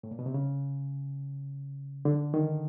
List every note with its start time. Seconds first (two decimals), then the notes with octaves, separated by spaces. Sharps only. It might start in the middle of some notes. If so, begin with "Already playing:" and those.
0.03 A2
0.11 A#2
0.19 B2
0.26 C3
0.34 C#3
2.05 D3
2.34 D#3